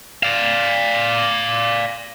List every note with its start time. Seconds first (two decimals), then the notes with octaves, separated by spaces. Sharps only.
0.23 D5 F5